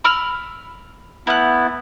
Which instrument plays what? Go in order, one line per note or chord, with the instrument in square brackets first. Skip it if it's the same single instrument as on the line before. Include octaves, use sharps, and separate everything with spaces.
[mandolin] B5 E6 F6
[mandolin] A3 F#6 [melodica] B3 E4